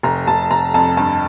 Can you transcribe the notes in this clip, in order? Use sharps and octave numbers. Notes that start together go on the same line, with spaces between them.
F1 A#5
F1 A5
F1 A#5
F2 A5
G2 A5